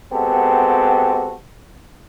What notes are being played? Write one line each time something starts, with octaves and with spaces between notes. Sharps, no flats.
G#3 B3 C4 F#4 G4 A4